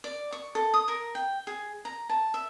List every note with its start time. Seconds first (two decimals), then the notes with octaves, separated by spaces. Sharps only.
0.04 D5
0.32 C#6
0.55 A4
0.74 D#6
0.88 A#4
1.15 G5
1.47 G#4
1.85 A#5
2.09 A5
2.34 E5